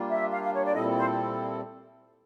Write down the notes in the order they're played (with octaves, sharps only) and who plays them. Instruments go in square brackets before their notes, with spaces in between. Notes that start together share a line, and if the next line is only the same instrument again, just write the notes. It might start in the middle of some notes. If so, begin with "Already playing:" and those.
Already playing: [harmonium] G3 A#3 D4 F4
[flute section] E5
F5
F5
C#5
D5
[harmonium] A#2 G3 C4 E4 A4 [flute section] D#5
[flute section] C5